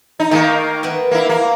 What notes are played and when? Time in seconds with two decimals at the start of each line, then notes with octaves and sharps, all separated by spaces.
0.20 D#4
0.31 D#3 A3 A#3 D#4 A4
0.83 B3 A#4 E5
1.11 A#3 E4
1.29 A#3